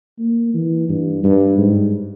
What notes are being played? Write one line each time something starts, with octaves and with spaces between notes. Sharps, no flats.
A#3
E3
G2
G2
G#2